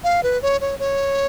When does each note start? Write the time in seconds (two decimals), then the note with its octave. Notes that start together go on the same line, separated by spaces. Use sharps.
0.04 F5
0.23 B4
0.42 C#5
0.61 C#5
0.79 C#5